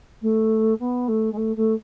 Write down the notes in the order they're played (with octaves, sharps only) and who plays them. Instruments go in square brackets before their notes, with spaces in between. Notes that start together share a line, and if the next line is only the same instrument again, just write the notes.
[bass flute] A3
B3
A3
G#3
A3
A3